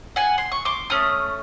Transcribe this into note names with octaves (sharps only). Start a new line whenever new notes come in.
F#5 G#5
C6
C#6
C6 D6
A3 C#4 D#6